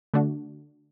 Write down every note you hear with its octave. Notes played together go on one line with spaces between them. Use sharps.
D3 A3 D4 F#4